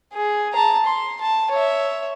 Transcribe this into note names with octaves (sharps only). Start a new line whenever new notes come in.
G#4
A5 A#5
C6
A5
C#5 E5